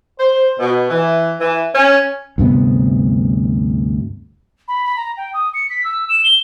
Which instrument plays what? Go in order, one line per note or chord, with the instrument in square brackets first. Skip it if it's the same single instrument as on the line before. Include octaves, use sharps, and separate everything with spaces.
[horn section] C5
B2
E3
E3
C#4
[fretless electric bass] D2 G2 C3 B3
[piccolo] B5
B5
A#5
G5
D#6
C#7
B6
E6
E7
G7